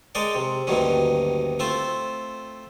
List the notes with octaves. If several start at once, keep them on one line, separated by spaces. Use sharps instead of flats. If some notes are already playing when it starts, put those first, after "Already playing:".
G#3 G#4 A#4 C#5 D5 G5
C3
D2 G2 D#3 F#3 A#3 C#4
A3 C4 F4 C5